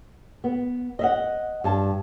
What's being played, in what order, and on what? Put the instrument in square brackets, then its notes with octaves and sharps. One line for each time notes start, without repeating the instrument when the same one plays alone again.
[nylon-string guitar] B3
D#5 E5 F#5
G2 A5